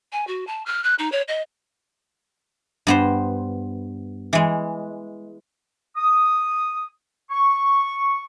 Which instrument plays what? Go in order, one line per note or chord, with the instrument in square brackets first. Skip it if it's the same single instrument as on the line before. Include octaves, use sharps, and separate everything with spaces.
[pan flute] G#5
F#4
A5
F6
F#6
D#4
C#5
D#5
[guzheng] G2 B3 C5
E3 G#3
[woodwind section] D#6
C#6